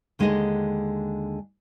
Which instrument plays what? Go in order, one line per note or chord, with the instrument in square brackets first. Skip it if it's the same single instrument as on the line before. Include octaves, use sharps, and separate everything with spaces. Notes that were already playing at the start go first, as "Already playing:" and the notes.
[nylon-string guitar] D#2 D3 G#3 D#4 G#4 D#5